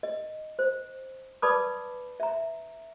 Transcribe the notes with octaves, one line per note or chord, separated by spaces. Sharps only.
D#5
C5
B4 D5 A5 B5 D6 D#6
E5 A#5